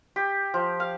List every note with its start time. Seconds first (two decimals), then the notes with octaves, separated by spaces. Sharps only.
0.16 G4
0.54 F3
0.80 F5